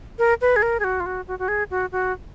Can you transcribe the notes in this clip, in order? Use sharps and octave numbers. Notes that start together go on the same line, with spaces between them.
A#4
B4
G#4
A#4
G#4
F#4
F4
F#4
F#4
F#4
G#4
F#4
F#4